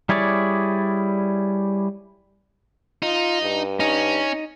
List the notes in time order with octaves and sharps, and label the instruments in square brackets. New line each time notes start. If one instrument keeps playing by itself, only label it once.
[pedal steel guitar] G3 E4 G#4 C#5 D5
[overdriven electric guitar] D#4 [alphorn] F4
[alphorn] G2
[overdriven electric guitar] C#4 [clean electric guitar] D#4